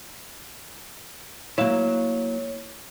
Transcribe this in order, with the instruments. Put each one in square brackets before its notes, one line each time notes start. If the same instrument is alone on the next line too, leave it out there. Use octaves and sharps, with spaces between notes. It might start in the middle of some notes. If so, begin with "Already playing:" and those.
[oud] F#3 A#3 [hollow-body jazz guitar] E4 E5 F5 [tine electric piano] C#5